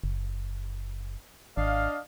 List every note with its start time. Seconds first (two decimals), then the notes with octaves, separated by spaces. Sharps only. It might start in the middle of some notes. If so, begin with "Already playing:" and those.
0.04 F#1
1.57 G#1 D4 D#5 F5